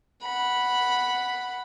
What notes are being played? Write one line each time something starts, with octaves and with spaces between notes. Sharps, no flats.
F#5 B5